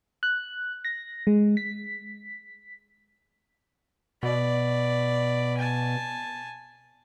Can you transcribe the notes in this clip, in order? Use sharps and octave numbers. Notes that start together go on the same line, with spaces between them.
F#6
A#6
G#3
B6
B2 D5 B5
G#5 A5